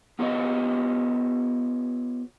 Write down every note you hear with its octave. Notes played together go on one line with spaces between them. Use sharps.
B3 F4 G4 B4 C#5 D#5